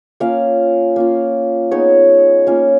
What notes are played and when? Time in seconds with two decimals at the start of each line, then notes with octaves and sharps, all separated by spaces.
0.20 A#3 C#4 F4 F5
0.96 A#3 C#4 F4
1.71 G#3 B3 D#4 C#5
2.47 A#3 C#4 F4